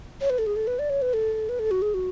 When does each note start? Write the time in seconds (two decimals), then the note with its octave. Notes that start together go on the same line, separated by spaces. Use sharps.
0.21 C#5
0.30 B4
0.38 A4
0.47 G#4
0.56 A4
0.67 B4
0.79 D5
0.90 C#5
1.02 B4
1.14 A4
1.49 B4
1.59 A4
1.71 F#4
1.82 G#4
1.94 F#4